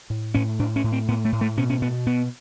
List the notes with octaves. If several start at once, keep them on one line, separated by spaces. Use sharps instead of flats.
A2
A2 C#4
A2 D4
C#4
A2
C4
A2 B3
A3
A2
A3
B2 C#4
C#4
B2 B3
B2 B3